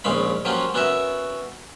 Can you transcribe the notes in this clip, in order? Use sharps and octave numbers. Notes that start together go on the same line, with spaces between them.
A#1 D#2 G#3 C#4 F5 B5
F3 F#3 A#3 C#4 F4 G4
B3 C#4 F#4 A#4 E5